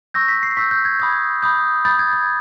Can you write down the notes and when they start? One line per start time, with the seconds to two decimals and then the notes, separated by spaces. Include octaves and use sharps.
0.14 C#6 E6 G6 A#6
0.28 B6
0.43 C7
0.57 C#6 E6 G6 B6
0.71 G6
0.85 G#6
1.00 B5 D#6 G6 G#6
1.42 B5 D#6 G6
1.85 B5 D#6 G6 A6
1.99 G#6
2.13 G#6